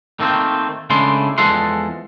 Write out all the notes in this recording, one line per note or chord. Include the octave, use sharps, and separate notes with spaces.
D#3 A3 A#3 C4
C#3 G#3 A3 D4 E4 C6
E2 F3 G#3 A4 F#5 C6